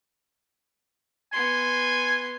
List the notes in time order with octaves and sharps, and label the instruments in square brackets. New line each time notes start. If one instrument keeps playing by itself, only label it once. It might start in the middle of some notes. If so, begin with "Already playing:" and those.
[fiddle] B3 C6 [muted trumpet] G#5